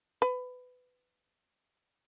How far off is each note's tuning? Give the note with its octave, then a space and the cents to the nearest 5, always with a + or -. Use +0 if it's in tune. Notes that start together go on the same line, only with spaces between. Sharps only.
B4 +20